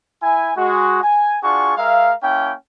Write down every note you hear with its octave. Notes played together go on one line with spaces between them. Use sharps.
E4 G#5
G#3 F#4
G#5
D4 F4 F#4 G#4 C#6
G#3 A#4 E5 F5
A#3 C#4 E4 G5